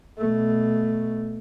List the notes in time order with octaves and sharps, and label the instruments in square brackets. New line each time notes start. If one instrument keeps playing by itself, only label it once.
[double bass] B2 A3